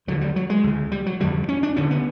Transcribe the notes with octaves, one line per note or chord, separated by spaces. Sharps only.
D#2 D3 F#3
G3
F#3
G#3
D2 C#3
G3
F#3
F2 D3 G3
C#4
D4
D2 D3 C#4
B3